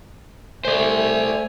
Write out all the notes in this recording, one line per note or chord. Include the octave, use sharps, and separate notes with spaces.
A3 C5 D5 G#5